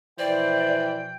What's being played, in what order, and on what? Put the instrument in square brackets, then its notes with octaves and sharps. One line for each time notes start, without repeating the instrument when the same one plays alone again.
[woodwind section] B2 F3 G5 [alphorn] E3 [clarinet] C5 [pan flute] D5